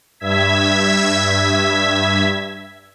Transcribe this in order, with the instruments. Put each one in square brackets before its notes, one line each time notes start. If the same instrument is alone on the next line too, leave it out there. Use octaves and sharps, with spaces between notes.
[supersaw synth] G2 E5 E6 G#6 B6